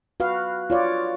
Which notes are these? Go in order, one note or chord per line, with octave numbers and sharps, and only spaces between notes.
F#4 B4 F5
F4 C#5 D5